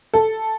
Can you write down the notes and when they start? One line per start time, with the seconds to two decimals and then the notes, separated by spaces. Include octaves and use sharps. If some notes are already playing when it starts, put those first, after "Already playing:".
0.14 A4